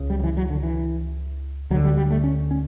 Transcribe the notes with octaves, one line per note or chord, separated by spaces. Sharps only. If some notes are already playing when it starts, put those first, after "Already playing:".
Already playing: C#2 C#3
G3
F#3
E3
F#3
D3
E3
D2 D3 F#3
G3
G3
A3
C#4
C#4